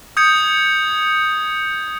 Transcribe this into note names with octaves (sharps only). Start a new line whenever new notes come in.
D#6 G6 G#6 C#7